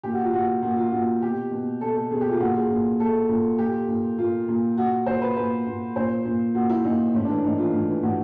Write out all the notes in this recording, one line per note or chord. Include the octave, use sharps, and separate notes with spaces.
A#2 G4
F#4
F4
A#2 F#4
A#2 F#4
F4
A#2 F#4
B2 G4
B2
B2 A4
A4
B2 G#4
G4
F4
A#2 F#4
G#4
A#2
A#2 A4
A#2
A#2 G4
A#2
A#2 F4
A#2
A#2 F#4
A#2 C5
B4
A#2 B4
A#2
A#2 C5
A#2
A#2 F#4
E4
A#2 D#4
A2 C#4
E3 D4
A2 D#4
E3 F4
A2
E3
A2 F#4